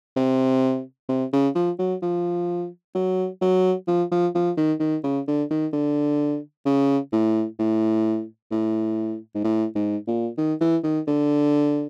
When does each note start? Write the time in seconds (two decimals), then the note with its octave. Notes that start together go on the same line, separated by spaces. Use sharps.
0.16 C3
1.09 C3
1.33 C#3
1.55 F3
1.79 F#3
2.02 F3
2.95 F#3
3.42 F#3
3.88 F3
4.12 F3
4.35 F3
4.57 D#3
4.80 D#3
5.04 C#3
5.28 D3
5.50 D#3
5.73 D3
6.66 C#3
7.13 A2
7.59 A2
8.51 A2
9.35 G#2
9.44 A2
9.75 G#2
10.07 A#2
10.38 D#3
10.61 E3
10.84 D#3
11.08 D3